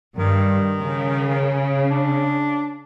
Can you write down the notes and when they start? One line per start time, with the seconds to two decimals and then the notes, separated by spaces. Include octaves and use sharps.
0.16 G2 D#3
0.81 C#3
1.91 D4